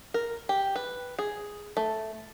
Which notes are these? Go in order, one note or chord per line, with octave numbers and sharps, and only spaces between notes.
A#4
G4
B4
G#4
A3